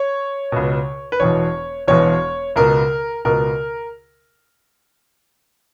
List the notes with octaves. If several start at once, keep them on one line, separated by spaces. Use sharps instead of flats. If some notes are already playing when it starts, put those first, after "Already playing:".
Already playing: C#5
C#2 B2
B4
E1 E2 B2 C#5
E1 E2 B2 C#5
C#2 B2 A#4
C#2 B2 A#4